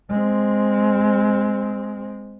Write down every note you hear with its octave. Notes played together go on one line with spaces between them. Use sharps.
G#3 C4